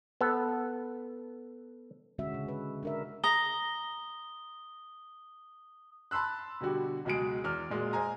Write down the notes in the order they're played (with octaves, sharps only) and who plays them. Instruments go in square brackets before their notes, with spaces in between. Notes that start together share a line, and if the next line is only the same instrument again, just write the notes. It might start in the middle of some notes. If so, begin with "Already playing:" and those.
[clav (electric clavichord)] B3 A4
[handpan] B2 D3 G#3 C#4 F#4 E5
C#3
B4
D4 A#4 E5
[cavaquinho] A#5 [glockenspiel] D#6 G7
[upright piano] A5 B5 C6 E6 F#6
B2 D3 G3 F#4 G4
C#2 B2 F#3 G#3 G#4 D7
E2 F6
A#2 G#3 F#4
C5 D#5 G#5 A#5